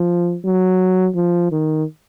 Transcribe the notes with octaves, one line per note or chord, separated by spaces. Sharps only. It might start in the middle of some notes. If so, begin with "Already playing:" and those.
Already playing: F3
F#3
F3
D#3